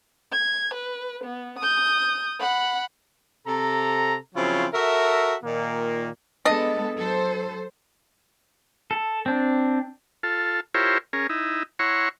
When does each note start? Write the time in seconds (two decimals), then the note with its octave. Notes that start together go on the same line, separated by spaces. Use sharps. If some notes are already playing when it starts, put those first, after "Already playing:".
0.32 G#6
0.74 B4
1.24 B3
1.59 D#6 G6
2.40 F#5 B5
3.47 C3 A4 A#5
4.35 C#3 F3 F#3 C4 E4 F4
4.74 F#4 A4 A#4 E5
5.44 A#2 D#3 A#3
6.45 G#3 B3 D4 A4 D#5
6.96 F#3 A4 C5
8.91 A4
9.26 C4 D4
10.23 F4 A4
10.74 E4 F4 G4 A#4 C5 C#5
11.13 C#4 G#4 A#4
11.29 D#4 E4
11.79 E4 C#5 F#5 A#5 C6 C#6